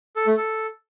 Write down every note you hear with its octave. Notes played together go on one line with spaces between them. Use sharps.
A4
A3
A4